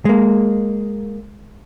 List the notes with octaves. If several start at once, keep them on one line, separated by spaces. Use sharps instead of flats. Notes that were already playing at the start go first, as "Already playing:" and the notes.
G#3 A#3